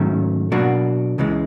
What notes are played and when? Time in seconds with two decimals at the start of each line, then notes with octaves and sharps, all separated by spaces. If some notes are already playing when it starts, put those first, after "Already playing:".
Already playing: G#2 D#3 F#3 A3 C#4
0.52 B2 F#3 A#3 D4 F#4
1.18 C#2 C#3 E3 G#3